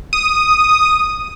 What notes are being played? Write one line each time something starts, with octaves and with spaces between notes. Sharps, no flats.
D#6